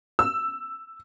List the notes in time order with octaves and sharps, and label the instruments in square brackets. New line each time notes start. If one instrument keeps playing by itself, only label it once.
[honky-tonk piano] E6